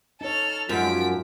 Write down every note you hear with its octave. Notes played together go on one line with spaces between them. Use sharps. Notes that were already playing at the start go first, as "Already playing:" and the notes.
D#4 A4 C#5 F6
F#2 F3 F#3 G#3 D#4 B6 D7